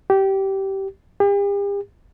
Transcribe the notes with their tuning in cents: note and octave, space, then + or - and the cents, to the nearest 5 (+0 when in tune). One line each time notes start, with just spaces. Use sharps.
G4 -20
G4 +40